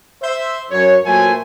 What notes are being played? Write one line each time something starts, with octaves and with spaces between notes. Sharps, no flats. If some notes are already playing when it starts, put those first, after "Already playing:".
C5 E5
F#2 C#5
A#2 F#3 A3 C5 G#5